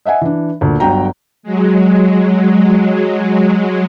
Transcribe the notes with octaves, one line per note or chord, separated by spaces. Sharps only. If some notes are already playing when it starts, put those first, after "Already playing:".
D#5 E5 F#5 G#5
E3 D4
D2 A#2
G1 F#3 G5 A#5
F#3 G#3